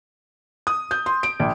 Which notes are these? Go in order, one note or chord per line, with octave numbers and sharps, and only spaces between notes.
D#6
G6
C6
D7
A#1